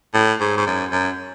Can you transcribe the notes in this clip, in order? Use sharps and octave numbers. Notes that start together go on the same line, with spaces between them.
A2
G#2
G#2
F#2
F#2